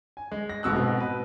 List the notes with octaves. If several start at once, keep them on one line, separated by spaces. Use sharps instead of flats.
G#5
G#3
A#6
F1 G#2 B2 E6 F#6
G#2 B2 C4
B4